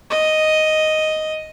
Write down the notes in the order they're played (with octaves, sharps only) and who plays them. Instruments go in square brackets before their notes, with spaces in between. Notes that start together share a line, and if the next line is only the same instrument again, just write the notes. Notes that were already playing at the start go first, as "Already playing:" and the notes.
[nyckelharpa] D#5